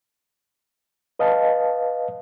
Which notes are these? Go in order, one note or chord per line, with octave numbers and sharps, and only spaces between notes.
B4 D#5 F5 A5